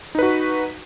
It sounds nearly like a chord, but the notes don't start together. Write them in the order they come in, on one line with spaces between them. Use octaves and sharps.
D#4 B4 F#4